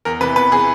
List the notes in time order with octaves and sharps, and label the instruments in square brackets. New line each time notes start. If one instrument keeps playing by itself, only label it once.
[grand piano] E2 A#4
C3 E3 B4
E2 B4
C3 E3 G#4